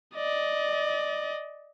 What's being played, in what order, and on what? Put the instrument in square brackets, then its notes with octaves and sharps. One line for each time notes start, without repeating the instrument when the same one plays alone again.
[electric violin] D5 D#5